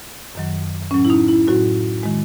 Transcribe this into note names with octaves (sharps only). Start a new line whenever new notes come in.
F#2 D#3 F#3
A2 F#3 C#4
E4
D#4
E4
A2 F#3 F#4
D#3 G#3